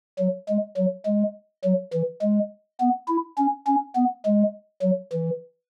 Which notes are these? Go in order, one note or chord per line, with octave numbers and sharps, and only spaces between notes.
F#3
G#3
F#3
G#3
F#3
E3
G#3
B3
E4
C#4
C#4
B3
G#3
F#3
E3